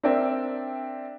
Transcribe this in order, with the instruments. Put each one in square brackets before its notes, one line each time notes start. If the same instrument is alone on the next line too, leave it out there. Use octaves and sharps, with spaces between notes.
[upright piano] C4 D4 A#4 D5 E5 G5